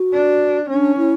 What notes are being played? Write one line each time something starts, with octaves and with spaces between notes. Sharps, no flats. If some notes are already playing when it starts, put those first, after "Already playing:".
Already playing: F#4
D4
C#4 D4
E4